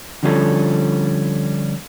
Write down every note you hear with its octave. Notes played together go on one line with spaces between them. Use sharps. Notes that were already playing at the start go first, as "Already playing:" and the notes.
D3 F3 G3 C#4 F4 A4